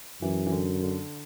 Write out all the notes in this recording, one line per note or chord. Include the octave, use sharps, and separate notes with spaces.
F#2 E3
E3
D3
D3